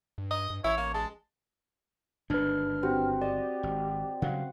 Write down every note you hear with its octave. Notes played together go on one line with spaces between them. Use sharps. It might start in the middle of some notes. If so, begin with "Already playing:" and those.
G2
D#5
G2
A1 E4 C#5
A#3
G#3 A5
G1 G#2 D#3 D4 B4 F6
C4 F#4 G4
G4 D5 D#5
G#1
C#3 F#3 G3 F5 F#5